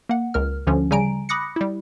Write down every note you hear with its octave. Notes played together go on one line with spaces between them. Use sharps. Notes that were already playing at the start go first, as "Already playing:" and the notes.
A#3 F#5
C#2 A#4 F6
D2 D3 F3 C#4
C#3 G3 G#5 A#5 D7
B5 D6 D#6 F#6 A#6 C#7
G3 E4